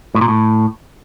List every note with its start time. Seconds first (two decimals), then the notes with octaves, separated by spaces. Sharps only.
0.15 A2
0.21 A#2
0.28 A2